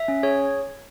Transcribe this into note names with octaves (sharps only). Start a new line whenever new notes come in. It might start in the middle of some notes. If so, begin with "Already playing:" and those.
Already playing: E5
C#4
G#4 C#5